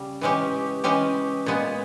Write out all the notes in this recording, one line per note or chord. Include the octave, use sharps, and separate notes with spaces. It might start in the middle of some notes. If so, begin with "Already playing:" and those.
Already playing: C#3 G3
E3 G#3 C#4 G4
E3 G#3 C#4 G4
A#2 G#3 B3